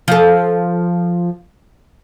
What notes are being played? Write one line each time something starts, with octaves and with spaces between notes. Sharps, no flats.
F3 A4